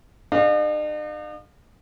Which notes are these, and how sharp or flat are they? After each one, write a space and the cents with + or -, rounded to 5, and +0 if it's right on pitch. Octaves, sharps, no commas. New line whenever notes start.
D#4 -45 G#4 +0 F5 +20